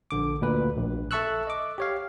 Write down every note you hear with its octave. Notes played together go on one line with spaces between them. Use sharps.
A#1 D3 D6
D2 A#2 B4
A#1
A4 E5 A5 C#6 E6 F#6
D#5 D6
G4 C#5 F5